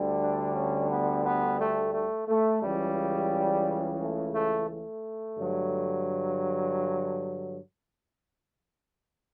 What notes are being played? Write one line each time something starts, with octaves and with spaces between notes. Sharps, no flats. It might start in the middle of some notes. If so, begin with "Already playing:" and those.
Already playing: D2 D3 G3
D4
C#4
B3
B3
A3
A3
A3
C#2 C#3 E3 G3
A3
A3
A3
G2 D3 F#3